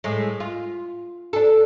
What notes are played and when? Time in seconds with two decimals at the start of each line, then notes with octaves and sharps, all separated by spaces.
0.04 A2 G#3
0.40 F4
1.33 D4 A4